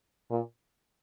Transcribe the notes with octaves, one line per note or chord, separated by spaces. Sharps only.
A#2